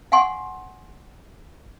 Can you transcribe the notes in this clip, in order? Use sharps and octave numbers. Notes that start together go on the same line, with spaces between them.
F5 F#5 G#5 C6 C#6